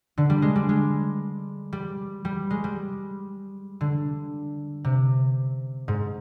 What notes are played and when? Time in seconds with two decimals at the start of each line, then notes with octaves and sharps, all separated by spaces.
0.17 D3
0.30 G3
0.42 G#3
0.56 G3
0.69 G#3
1.73 G3
2.25 G3
2.50 G#3
2.64 G3
3.81 D3
4.84 C3
5.88 G#2